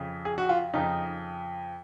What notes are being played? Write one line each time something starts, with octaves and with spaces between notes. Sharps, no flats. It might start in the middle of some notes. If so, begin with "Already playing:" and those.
Already playing: F2 C#3
G#4
F#4
F4
F2 C#3 D#4